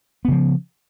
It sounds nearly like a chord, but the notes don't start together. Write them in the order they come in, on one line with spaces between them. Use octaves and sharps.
B3 C#3 F3